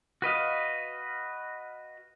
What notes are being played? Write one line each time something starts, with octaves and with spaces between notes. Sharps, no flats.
F#4 B4 D#5 F5